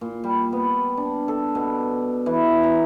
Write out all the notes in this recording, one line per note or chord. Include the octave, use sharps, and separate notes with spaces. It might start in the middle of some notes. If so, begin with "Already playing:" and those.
A#2
G3
B3
D4
A4
B2
E3
A#5